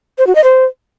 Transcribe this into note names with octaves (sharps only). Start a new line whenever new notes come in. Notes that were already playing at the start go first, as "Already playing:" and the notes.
C5
F#4
D#5
C5